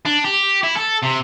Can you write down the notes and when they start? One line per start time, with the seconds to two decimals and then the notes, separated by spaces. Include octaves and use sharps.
0.06 D4
0.25 G4
0.63 E4
0.77 A4
1.03 C3